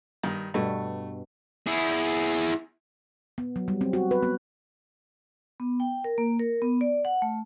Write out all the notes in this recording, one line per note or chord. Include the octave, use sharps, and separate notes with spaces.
G2 D#3
G2 B2 A3
E4 G#4
B3
F#3
G3
C4
F#4
B4
B3
B3
G5
A#4
A#3
A#4
B3
D5
F#5
A3